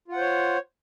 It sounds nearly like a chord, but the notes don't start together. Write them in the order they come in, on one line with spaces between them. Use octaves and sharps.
F4 F#5 C5 C#5